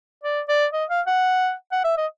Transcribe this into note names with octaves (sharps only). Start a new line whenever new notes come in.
D5
D5
D#5
F5
F#5
F#5
E5
D#5